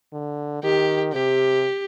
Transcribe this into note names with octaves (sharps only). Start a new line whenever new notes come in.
D3
D#3 G4
C3 G4